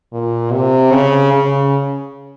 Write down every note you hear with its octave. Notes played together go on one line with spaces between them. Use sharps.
A#2
C3
C#3
C#3